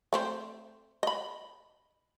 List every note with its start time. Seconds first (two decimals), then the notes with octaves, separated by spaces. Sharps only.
0.13 A3 C4 C5
1.03 D#5 B5